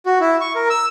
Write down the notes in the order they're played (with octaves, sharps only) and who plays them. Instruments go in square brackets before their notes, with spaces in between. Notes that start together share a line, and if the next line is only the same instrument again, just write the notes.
[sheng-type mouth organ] F#4
E4
C#6
A#4
E6